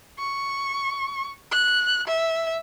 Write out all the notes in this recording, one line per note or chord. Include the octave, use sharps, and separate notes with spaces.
C#6
F#6
E5